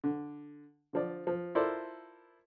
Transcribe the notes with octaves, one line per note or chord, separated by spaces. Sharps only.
D3
D3 F3 D5
F3
E4 F4 A4 A#4 C5 D5